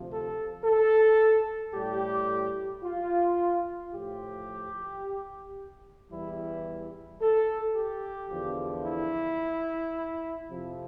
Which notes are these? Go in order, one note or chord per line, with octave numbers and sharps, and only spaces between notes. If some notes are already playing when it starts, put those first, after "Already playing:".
Already playing: D2 C3 F3
A4
A4
A2 G3 G4
F4
A2 F3 G4
E2 E3 G3 E4
A4
G4
E2 D3 F3
E4
F2 C3 F3